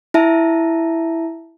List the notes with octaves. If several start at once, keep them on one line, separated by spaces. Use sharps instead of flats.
E4 E5 A5